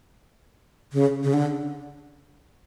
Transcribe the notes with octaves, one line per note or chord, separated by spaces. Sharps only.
C#3
C#3
D3